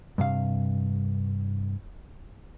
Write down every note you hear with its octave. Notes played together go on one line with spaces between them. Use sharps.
G2 C3 F5